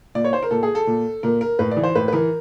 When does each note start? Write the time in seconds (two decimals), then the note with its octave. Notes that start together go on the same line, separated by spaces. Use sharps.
0.15 A#2 D5
0.24 C#5
0.33 C5
0.42 A#4
0.51 A#2 A4
0.63 G#4
0.75 A4
0.87 A#2
1.23 A#2 A#4
1.41 A#4
1.59 A2 B4
1.71 D5
1.77 E3
1.83 C5
1.95 A2 B4
2.08 B4
2.13 E3 A#4